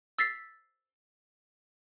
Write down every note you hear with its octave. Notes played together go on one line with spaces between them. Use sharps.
E6 A6 B6 C7